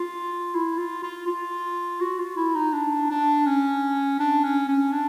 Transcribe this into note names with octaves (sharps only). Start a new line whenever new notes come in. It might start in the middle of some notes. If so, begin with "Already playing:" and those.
Already playing: F4
E4
F4
F4
F4
F#4
F4
E4
D#4
D4
D4
C#4
D4
C#4
C#4
D4